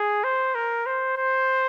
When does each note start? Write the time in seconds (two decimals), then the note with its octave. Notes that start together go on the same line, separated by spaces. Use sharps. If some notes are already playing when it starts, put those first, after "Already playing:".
Already playing: G#4
0.24 C5
0.55 A#4
0.86 C5
1.17 C5